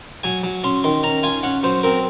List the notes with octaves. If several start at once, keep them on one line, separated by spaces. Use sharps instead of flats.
F#3 G#5
F#3
C#4 C6
D#3 C6
C#4 A#5
F4 G#5
C#4 F#5
F#3 C5
C4 A#4